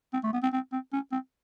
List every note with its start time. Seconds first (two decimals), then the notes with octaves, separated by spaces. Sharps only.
0.13 C4
0.23 A3
0.33 B3
0.43 C4
0.53 C4
0.72 C4
0.93 C#4
1.12 C4